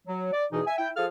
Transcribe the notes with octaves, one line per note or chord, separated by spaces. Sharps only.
F#3
D5
E2 B2 E3 D#4 G#4
E5 G#5
E4 G5
F3 G#4 A4 F5 F6